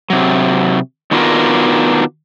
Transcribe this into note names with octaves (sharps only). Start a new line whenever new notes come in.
C3 F#3
D#3 B3 D4 F4 F#4 A#4